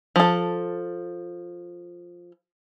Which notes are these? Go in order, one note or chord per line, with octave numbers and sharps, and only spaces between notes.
F3 A4